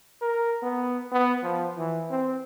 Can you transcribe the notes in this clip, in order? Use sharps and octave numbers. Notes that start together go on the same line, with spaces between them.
A#4
B3
B3
F3
E3
C4